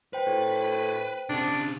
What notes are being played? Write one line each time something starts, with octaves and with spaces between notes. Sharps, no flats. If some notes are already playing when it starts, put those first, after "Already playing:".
B4 C5 G5
A2
C#3 C4 D4